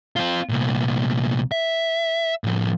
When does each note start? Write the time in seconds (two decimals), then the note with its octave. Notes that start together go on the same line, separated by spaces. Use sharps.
0.16 C4 F4
0.49 C2 A#2
1.51 E5
2.44 A2 F3